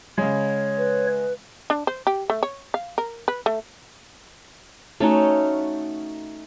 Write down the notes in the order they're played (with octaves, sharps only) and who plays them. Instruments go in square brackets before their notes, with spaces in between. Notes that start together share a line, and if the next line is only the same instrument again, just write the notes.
[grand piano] C#3 G#3 [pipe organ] C#5
[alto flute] B4
[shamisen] D4
C5
G4
A3
C#5
F5
A#4
B4
A3
[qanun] A3 C#4 D#4 F#4